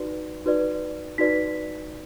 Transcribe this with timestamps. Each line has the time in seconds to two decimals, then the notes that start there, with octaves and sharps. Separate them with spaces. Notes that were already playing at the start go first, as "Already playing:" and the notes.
Already playing: D#4 F#4 B4 D5
0.45 D#4 F#4 B4 D5
1.18 D#4 F#4 B4 D5 B6